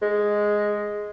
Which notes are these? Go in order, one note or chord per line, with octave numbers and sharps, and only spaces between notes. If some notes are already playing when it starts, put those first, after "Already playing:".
G#3